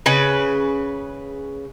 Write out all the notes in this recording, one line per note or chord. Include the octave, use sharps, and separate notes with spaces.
C#3 B4